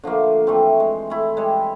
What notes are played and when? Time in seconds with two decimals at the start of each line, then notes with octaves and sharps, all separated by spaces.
0.04 D3 F3 A3 A#3
0.47 E3 A3 C4
0.80 G#3
1.10 A3 E4
1.37 G3 G#3